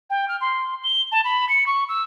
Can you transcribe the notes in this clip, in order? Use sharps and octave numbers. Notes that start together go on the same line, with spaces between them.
G5
F6
C6
G7
A5
B5
C#7
C#6
E6